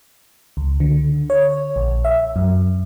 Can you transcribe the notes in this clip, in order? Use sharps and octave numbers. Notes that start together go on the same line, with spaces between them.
C#2
D3
C#5
A#1
E5
F#2